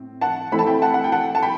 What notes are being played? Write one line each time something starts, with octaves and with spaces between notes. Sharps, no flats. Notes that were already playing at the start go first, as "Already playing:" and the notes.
Already playing: A2 C4
F#5 A5
E3 A3 C4 E4 B5
A5
G5 B5
F#5 A5
F#5
G5
F#5 A5
A5
G5 B5